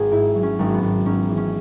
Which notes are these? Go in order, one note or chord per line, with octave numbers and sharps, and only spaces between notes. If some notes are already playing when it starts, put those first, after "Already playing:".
Already playing: G#1 G#4 B4 F#5
G#2 E4
F#3
C#4
G#1
B3
G#1
G#2 C#4
E3
C#4